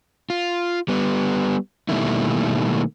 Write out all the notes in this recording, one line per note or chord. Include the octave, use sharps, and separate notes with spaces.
F4
G3 B3
B2 D#3 G3 A3 A#3 E4